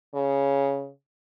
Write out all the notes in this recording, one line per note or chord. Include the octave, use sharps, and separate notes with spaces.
C#3